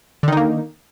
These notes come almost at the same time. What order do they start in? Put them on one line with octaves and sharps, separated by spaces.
D3 D#3 D#4 A#3